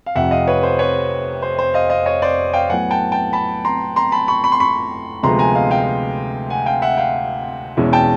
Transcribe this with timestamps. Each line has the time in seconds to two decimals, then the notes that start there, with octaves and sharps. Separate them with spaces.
0.06 F5
0.15 F1 F2 C3 E5 F#5
0.31 D#5 F5
0.47 B4 C#5
0.63 C5
0.79 B4 C#5
1.42 C5
1.59 C5
1.74 D#5 F5
1.90 D#5 F5
2.06 C#5 D#5
2.22 C5 D5
2.54 F5 G5
2.69 A2 F#3 B3 F#5 G#5
2.91 G5 A5
3.12 G5 A5
3.33 A5 B5
3.65 A#5 C6
3.96 A#5 C6
4.12 A5 B5
4.28 B5 C#6
4.44 B5 C#6
4.52 C6
4.60 B5 C#6
5.23 D2 C3 F3 G#3 B3 A#5 C6
5.39 G#5 A#5
5.55 D#5 F5
5.71 F5 G5
6.50 F#5 G#5
6.66 F5 G5
6.82 E5 F#5
6.97 F5 G5
7.77 E2 B2 G#3 C#4 E4
7.93 G5 A5